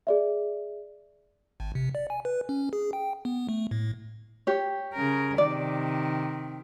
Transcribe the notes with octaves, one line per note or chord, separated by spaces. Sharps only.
G#4 D5 E5
G#1
C3
D5
G#5
B4
C#4
G#4
G5
B3
A3
A2
G4 C#5
C#3 A#4
C3 D#3 D5